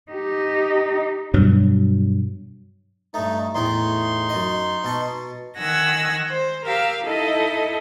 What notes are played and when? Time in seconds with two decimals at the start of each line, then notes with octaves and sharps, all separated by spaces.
0.12 D#4 G4
1.34 G2 B2 F#3
3.14 G2 A3 D#4
3.55 E2 A2 D#4 G#4 C6
4.29 F#2 D#5
4.84 B2 A5 C#6
5.57 D#3 F#5 G#5 E6 A#6
6.28 C5
6.65 G4 A#4 F5 E6
7.04 D#4 E4 A4 D#5